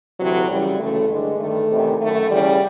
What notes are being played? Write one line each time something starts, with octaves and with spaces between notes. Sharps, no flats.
D2 C3 E3 F#3
F#2 C#3 E3 G3
D2 C#3 E3 A3
G2 D3 G#3
G2 D#3 A3
E2 C3 D#3
F#2 D#3 A3
E2 C#3 E3 G3